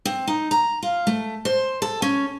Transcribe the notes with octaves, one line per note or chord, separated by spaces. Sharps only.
C4
D#4
A#5
F4
A3
C5
A4
C#4